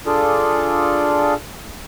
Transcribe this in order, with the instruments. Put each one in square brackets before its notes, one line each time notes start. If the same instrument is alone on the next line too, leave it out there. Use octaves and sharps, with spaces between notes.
[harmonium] D4 F4 G#4 A4 D5